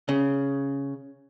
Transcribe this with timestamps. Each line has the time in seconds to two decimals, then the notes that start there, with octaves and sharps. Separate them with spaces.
0.09 C#3